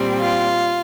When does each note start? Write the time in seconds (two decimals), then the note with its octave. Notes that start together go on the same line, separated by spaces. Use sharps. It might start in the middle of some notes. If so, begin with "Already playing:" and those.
Already playing: A#2 G3 C4
0.20 F4